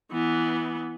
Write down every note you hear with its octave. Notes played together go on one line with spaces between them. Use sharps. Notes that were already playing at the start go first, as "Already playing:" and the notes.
E3 B3